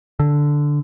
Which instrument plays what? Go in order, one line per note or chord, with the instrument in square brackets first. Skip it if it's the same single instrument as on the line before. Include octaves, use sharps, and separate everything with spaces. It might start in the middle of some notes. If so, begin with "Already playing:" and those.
[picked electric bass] D3